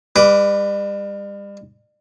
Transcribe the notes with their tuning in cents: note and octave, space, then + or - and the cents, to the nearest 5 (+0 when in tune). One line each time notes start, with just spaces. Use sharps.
G3 +40 B4 +0 D6 -5